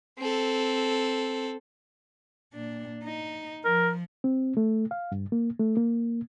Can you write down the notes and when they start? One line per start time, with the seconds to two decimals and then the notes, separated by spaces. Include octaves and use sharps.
0.18 C4 A4
2.54 A#2 D4
3.04 D#4
3.65 F3 A#4
4.24 C4
4.57 A3
4.91 F5
5.12 G2
5.32 A#3
5.59 A3
5.77 A#3